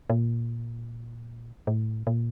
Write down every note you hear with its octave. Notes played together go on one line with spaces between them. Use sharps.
A#2
A2
A#2